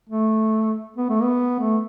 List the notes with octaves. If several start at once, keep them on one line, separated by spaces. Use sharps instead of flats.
A3
B3
A3
B3
A3